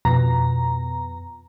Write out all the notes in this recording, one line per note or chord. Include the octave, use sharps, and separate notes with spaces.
F2 B2 A#5